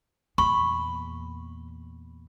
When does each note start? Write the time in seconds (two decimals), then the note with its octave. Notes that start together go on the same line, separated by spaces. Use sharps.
0.38 E2 A#2 B5 C#6